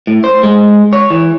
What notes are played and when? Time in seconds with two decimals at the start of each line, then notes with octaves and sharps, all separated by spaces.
0.07 A2
0.24 C5
0.43 G#3
0.93 C#5
1.10 E3